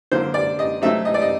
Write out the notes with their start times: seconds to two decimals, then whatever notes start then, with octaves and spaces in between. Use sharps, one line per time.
0.12 D3 F#3 A#3 C5
0.34 D5
0.59 D#5
0.82 F#3 A3 C4 D#4 E5
1.05 D#5
1.14 D5
1.22 D#5